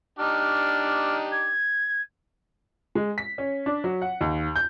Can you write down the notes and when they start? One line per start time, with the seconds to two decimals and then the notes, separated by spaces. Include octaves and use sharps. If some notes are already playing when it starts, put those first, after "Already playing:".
0.19 D4 D#4 G4 F6
1.32 G#6
2.95 G#3
3.18 B6
3.38 C#4
3.66 D4
3.84 F#3
4.02 F#5
4.21 D#2
4.56 G6